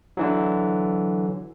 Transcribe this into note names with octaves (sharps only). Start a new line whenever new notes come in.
D3 E3 F#3